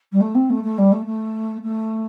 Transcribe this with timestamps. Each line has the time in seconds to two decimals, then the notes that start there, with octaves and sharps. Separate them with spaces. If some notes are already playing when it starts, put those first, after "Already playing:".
0.12 G3
0.20 A3
0.34 C4
0.49 A3
0.64 A3
0.78 G3
0.92 A3
1.06 A3
1.63 A3